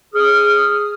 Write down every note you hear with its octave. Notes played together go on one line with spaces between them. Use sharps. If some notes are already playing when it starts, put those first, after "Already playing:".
G#4 D#6 F6